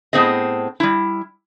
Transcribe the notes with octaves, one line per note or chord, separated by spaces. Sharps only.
A2 B3 C4 G#4 D#5
G3 E4